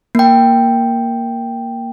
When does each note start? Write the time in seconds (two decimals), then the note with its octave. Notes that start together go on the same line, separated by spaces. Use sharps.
0.15 A#3 G5